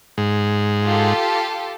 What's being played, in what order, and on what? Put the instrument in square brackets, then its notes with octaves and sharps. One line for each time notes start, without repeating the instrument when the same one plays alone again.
[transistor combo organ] G#2
[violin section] F4 G4 A4